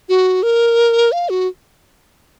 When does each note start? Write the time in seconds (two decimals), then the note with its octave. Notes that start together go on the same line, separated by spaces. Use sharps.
0.09 F#4
0.43 A#4
1.12 F5
1.29 F#4